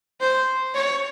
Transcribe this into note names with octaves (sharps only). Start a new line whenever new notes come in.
C5
C#5